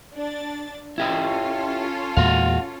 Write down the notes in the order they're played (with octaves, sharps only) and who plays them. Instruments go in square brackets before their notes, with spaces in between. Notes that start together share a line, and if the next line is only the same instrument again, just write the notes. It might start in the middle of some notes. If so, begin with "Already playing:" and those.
[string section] D4 A6
[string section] C#4 F4 A4 [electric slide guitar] E4 G4 D#5
[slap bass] E2 A#2 G#3 [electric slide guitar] F#4 F5